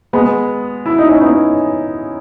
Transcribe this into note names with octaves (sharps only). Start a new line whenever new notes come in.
G#3 B3
E4
D#4
C#4
B3 D#4